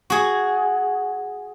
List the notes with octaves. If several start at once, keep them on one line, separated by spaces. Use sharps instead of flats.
F#4 G#4